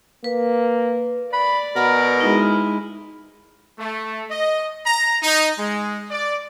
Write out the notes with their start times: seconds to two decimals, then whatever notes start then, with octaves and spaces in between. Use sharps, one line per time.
0.24 A#3 B4
1.33 D5 B5
1.76 B2 A#4 F#5 A#5 B5
2.21 G#3 D#4 E4
3.79 A3
4.30 D#5
4.86 A#5
5.23 D#4
5.58 G#3
6.11 D5